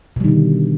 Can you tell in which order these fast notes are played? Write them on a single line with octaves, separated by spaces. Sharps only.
B2 G3 D#3 D3